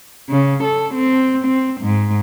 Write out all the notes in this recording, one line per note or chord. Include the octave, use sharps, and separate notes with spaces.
C#3
A4
C4
C4
G#2